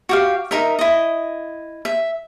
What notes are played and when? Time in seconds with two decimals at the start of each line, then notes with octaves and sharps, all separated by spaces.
0.09 F#4 G4 F5
0.51 D#4 A#4 E5
0.79 E4 D#5
1.85 E5